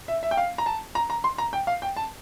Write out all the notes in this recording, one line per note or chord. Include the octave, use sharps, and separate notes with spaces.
E5
E5
G5
F5
A#5
A5
A#5
A#5
C6
A#5
G5
F5
G5
A5